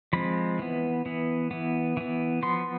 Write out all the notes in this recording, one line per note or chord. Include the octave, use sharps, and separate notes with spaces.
F3 G#3 C4 B5
E3 B3
E3 B3
E3 B3
E3 B3
F3 B3 C6